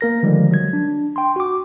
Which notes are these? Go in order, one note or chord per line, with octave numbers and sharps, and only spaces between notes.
A#3 A#4 A#6
D3 D#3 F3 G3 G#3
F#3 G#6
D4
G5 C6
F#4 D6